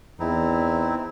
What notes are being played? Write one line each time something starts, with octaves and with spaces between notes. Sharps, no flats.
E2 C4 D#4 E4